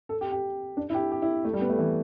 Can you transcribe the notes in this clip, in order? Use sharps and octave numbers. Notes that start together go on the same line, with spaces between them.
A4
G4
G4
D4
E4
G4
G4
E4
A3
G3
B3
A3
E3